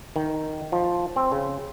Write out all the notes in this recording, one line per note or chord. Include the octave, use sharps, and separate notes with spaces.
D#3
F3
C4
C#3